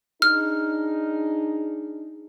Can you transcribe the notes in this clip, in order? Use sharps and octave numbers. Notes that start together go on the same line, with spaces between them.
D4 D#4 G#4 F6